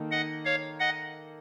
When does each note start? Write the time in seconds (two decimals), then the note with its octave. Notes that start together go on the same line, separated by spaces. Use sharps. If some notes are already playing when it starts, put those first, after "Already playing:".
Already playing: D#3 A#3 D#4 A4
0.11 D#5 F#5
0.45 C#5 F5
0.80 D#5 F#5